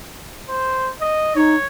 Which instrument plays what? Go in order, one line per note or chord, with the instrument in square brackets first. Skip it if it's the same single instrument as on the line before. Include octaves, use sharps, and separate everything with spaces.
[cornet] C5
D#5
[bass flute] D#4 [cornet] C#5